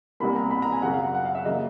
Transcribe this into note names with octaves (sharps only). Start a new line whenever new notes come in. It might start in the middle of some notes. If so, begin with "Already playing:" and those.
C2 B2 G3 A#3 B5
A#5
B5
A#5
G#5
F#2 C#3 F#3 F#5
F5
F#5
F#5
F5
E5
C#3 F#3 A#3 D#5